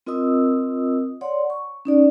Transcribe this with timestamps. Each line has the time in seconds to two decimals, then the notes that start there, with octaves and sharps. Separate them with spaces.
0.06 C4 F4 A#4 D#5 D#6 E6
1.21 C#5 D5 F#5 C6
1.50 C#6
1.85 C#4 D#4 D5